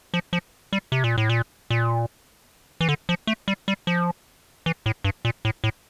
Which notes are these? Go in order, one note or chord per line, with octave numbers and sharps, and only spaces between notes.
F3
F3
G3
C3
A#2
A2
A#2
A#2
E3
D3
F3
A3
G3
G3
F3
E3
A2
G2
A#2
A2
A2